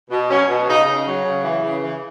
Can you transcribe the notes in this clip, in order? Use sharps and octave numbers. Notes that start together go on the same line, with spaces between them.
B2
F#3 C#4
B2
C#3 D#4
C#3
F#3
C#3
E3
C#3
E3